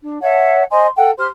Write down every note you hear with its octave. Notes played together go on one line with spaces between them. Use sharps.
D4
C#5 E5 F#5 A5
C5 D#5 G#5 C6
A4 F#5 G5
G4 C5 C6 F6